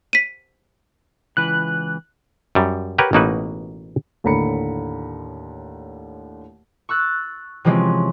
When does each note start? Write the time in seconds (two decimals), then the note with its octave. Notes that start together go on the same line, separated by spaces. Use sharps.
0.13 B6 D#7
1.37 C#2 E3 B4 F#6
2.55 F#2 G3
2.98 G4 A#4 B4 C#5 F#5
3.13 A1 B2 A#3 D#4 F#4 B4
4.24 D#2 A2 D3 A#5 B5 C#7
6.89 C#6 E6 F#6 A6
7.65 C3 E3 F3 G#3 C4 C#4